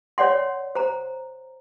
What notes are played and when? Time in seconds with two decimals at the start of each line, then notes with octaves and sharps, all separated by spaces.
0.18 C#5 D5 F#5 C6
0.75 C5 A#5